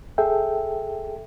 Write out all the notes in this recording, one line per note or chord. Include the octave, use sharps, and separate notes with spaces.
G#4 A4 E5 G5